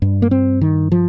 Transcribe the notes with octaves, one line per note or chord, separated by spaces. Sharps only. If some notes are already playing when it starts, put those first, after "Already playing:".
G2
A#3
C4
D#3
F3